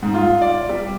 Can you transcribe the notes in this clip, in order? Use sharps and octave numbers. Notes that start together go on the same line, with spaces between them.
G#2
F4
D5
G3